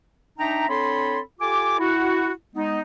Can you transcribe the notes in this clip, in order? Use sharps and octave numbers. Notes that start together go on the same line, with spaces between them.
D4 D#4 E5 G5 A#5
C4 D4 A4 C#5 B5 C6
F4 G4 A4 G#5 D6
E4 F#4
G#3 B3 D#4